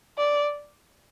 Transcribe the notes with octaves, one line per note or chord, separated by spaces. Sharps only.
D5